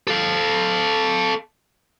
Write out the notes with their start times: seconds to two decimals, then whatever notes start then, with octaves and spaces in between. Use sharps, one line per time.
0.07 A4 F5